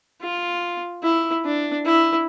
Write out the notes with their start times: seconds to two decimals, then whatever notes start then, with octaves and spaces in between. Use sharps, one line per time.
0.21 F4
1.03 E4
1.45 D4
1.85 E4